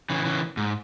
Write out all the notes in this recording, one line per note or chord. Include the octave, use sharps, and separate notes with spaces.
C#3 E3
C#3 E3
G#2